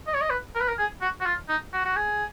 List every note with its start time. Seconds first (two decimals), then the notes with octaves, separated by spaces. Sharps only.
0.07 D#5
0.14 C#5
0.21 D#5
0.30 B4
0.55 A#4
0.61 B4
0.68 A#4
0.78 G#4
1.01 F#4
1.20 F#4
1.26 F4
1.49 D#4
1.73 F#4
1.84 F#4
1.96 G#4